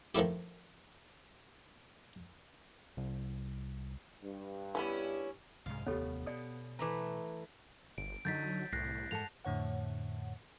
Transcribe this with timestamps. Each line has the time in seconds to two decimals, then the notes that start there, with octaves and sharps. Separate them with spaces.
0.15 D#3 F3 A3 E4 G4
2.97 C2
4.22 G2
4.75 E3 F3 B3 C#4 E4 G4
5.66 C2 G#2 G#3 F5
5.86 F1 D#2 A3 B3 G4 A4 C#5
6.26 B2 D5 D#6
6.79 E3 A3 B4 A#5 D6
7.98 G1 D7
8.25 D3 F#3 D#4 G6 A6 B6
8.72 C2 A2 F#6 A#6 C7
9.11 G#2 A4 F#5 A5 F7
9.44 F2 A2 D3 C#5 F#5